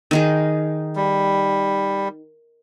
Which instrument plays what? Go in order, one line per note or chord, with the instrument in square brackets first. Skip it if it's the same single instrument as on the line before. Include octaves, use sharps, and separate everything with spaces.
[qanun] D#3 D#4 G#4
[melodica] G3